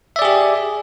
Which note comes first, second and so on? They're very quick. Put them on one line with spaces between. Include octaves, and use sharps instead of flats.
E5 D5 G#4 G4